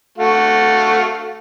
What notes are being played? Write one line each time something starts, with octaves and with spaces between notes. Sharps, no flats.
A3 F#4 F5